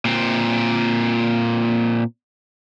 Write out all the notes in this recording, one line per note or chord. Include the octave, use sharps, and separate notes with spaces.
A#2 C4